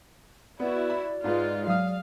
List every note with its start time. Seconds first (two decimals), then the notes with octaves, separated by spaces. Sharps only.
0.60 B3 E4 F#4 D5
0.90 B5
1.24 G#2 G#3 F4 B4
1.68 F#3 F5 D#6 F6